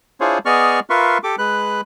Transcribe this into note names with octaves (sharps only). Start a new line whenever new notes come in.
D4 E4 F4 G#4 C5 C#5
B3 G#4 D5 D#5 C#6 F6
F4 A#4 B4 E5 C6 C#6
G4 A4 D6
G#3 B4 F#6